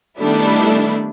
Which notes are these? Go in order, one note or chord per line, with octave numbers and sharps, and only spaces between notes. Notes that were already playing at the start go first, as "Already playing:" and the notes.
D#3 G3 A3 B3 D4 E4